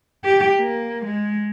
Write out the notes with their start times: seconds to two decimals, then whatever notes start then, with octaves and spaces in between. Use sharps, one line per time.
0.25 G4
0.59 A#3
1.06 G#3